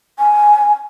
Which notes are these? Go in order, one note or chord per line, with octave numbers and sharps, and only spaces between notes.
G#5